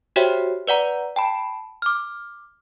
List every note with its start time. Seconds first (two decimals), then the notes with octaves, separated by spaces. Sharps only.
0.16 F#4 G4 C5 C#5 E5 G5
0.67 B4 D5 F#5 A#5
1.16 G5 A5 B5
1.82 D6 F6